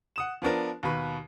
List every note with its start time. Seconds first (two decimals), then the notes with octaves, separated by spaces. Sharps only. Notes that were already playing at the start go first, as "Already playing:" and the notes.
0.16 F#5 D#6 E7
0.42 F3 B3 D4 A#4
0.83 D#2 B2 B4